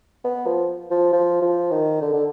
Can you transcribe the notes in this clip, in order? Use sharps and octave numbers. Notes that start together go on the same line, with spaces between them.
B3
F3
F3
F3
F3
D#3
D3
D3